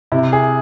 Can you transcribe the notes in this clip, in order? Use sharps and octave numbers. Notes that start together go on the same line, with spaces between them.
C3 E4
G#4